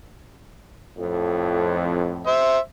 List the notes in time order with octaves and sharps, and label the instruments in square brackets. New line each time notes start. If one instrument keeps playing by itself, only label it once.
[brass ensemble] F2 A2
[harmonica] C5 E5